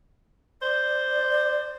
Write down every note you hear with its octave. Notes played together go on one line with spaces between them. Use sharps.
C5 D5